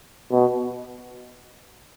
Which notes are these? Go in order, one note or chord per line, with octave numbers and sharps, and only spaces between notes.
B2